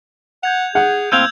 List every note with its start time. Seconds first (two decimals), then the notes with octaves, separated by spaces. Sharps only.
0.43 F#5 G6 G#6 F7
0.75 G#4 F#5
1.12 A2 A#3 C4 F5 E6 G6 G#6